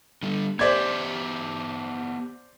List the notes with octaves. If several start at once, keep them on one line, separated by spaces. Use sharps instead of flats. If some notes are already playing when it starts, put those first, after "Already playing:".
D3 G3
B3 G4 C5 D5 E5 G#6